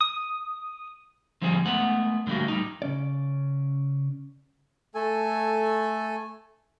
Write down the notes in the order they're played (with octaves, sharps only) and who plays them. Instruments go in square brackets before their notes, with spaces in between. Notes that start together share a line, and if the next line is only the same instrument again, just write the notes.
[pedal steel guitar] D#6
[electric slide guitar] D3 F3 G3 C4 G#4
G#3 A3 B3 F#5
D3 G3 A3 A#3 F#4
G3 D#4
[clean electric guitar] C#3 C#4 D5
[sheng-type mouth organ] A3 A4 G#5